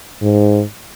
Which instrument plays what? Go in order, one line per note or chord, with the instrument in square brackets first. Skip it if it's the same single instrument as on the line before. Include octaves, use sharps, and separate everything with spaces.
[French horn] G#2